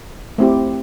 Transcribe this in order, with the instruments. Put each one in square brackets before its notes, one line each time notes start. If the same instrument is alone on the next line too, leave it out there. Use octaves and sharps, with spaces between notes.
[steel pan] A3 C4 E4 G4